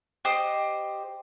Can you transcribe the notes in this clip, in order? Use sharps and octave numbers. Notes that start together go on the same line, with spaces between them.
G4 C5 D#5